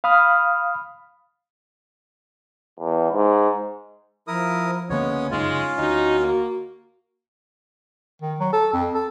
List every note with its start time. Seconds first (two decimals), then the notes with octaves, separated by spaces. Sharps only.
0.04 F5 B5 D#6 F6
2.79 E2
3.11 G#2
4.27 F3 E4 A#4 D#6
4.90 C#2 D3 G#3 A#3 B3 C#4 C#5
5.31 F1 F#2 C#3 G#3 C#4 D#4 F4
5.78 D2 D#4 F#4
6.19 A#3
8.22 D#3
8.40 F#3
8.53 A4
8.73 F2
8.94 A4